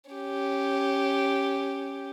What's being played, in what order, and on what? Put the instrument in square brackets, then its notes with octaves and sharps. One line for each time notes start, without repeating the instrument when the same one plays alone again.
[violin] C#4 G4